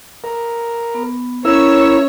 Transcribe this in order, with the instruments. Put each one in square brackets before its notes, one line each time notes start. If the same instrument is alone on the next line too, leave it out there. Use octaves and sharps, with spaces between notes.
[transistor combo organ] A#4
[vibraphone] B3
[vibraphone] C#4 [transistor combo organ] E4 A#4 [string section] C#5 [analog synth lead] E6